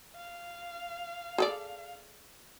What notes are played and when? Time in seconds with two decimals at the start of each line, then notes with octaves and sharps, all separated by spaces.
0.16 F5
1.38 G#4 A4 D5